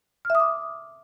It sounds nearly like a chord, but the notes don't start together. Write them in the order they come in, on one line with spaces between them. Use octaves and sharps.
F6 E5 D#6 D6